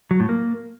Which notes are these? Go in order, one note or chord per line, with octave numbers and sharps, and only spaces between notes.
F#3
A2
A#3